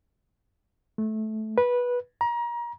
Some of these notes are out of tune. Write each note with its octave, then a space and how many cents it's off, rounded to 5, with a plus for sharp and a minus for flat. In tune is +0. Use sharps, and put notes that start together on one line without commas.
A3 -15
B4 -15
A#5 +30